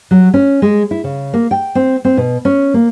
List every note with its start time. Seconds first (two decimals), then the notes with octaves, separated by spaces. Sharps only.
0.11 F#3
0.34 C#4
0.62 G#3
0.91 E4
1.04 C#3
1.33 A#3
1.51 G5
1.75 C4
2.05 C4
2.17 B2
2.45 C#4
2.74 A#3